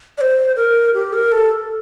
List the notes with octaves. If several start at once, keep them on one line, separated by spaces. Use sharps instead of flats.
D5
C5
A#4
G4
A#4
A4